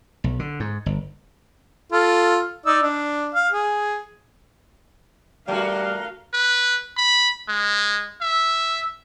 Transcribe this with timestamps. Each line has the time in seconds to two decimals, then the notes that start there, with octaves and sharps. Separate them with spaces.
0.24 B1
0.39 D3
0.60 G#2
0.86 G1
1.92 F4 A4
2.66 D#4 D5 E6
2.83 D4
3.35 F5
3.52 G#4
5.48 G3 A3 F#4 A#4 F5
6.33 B4
6.97 B5
7.48 G#3
8.21 E5